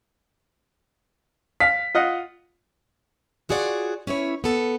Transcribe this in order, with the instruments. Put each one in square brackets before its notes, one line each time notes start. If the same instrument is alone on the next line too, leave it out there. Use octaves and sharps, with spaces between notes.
[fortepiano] F5 [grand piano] B6
[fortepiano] F4 D#5 F#5
[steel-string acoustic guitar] F4 F#4 G#4 C#5 D5 F#5
C#4 E4 B4 C#5
B3 A4